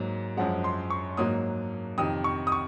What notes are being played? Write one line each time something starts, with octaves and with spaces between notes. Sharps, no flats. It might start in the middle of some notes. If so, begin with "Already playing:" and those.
Already playing: G#2 F#3 A#3
F#2 F3 G#3 F#5
C6
C#6
G#2 F#3 A#3 D#6
F2 C3 D#3 D#6
C#6
D#6
C#6